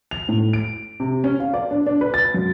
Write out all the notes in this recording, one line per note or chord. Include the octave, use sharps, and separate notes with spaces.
F7
A2
D7
C3
C#4
F5
D5
D4
D4
B4
A6
F#2